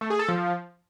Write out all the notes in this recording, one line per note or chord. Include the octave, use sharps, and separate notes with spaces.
A3
G#4
A4
F3